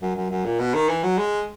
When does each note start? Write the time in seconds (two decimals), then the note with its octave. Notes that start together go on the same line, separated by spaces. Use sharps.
0.01 F#2
0.15 F#2
0.30 F#2
0.45 A#2
0.59 B2
0.74 D#3
0.89 E3
1.03 F#3
1.18 G#3